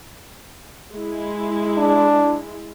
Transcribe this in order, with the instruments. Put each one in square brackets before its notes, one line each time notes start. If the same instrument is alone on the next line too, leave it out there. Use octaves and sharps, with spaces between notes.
[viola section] G#3 E4
[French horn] D4